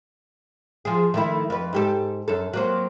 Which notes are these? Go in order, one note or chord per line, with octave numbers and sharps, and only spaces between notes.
F3 G#4
D#3 A3 E4
F2 B4
G#2 G4 A4
F#2 A4
F#3 A#3 C4